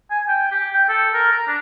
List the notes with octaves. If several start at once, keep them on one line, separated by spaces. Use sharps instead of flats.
G#5
G5
G4
G5
A4
A#4
A#5
D4